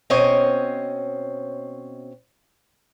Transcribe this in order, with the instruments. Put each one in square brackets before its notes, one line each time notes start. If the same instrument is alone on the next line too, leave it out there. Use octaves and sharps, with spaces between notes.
[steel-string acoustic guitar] B2 C4 C#4 C5 C#5 D#5